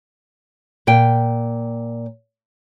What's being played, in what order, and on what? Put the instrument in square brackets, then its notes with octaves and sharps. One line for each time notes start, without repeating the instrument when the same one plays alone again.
[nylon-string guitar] A#2 F5 G5